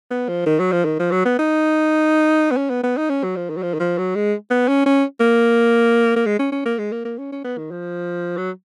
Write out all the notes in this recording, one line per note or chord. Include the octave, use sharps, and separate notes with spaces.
B3
F3
D#3
F#3
F3
D#3
F3
F#3
B3
D#4
B3
C#4
B3
B3
D#4
C#4
F#3
F3
D#3
F#3
F3
D#3
F3
F#3
G#3
B3
C#4
C#4
A#3
A#3
G#3
C#4
C#4
A#3
G#3
A#3
A#3
C#4
C#4
B3
D#3
F3
F#3